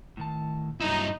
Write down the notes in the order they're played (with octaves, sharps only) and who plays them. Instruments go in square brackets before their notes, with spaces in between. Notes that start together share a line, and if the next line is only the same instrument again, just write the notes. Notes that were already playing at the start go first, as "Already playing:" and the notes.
[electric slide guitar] A2 D#3 A5
[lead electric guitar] G2 E4 [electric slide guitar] F#3 [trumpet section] D#4